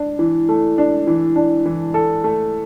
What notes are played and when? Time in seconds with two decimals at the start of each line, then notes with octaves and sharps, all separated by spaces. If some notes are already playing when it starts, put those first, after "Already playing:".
Already playing: D4
0.19 E3
0.49 A3
0.78 D4
1.07 E3
1.36 D4
1.66 E3
1.94 A4
2.24 A3